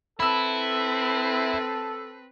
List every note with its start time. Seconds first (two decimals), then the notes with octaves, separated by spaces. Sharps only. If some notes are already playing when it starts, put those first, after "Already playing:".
0.20 C4 E4 A4 B4 B5 E6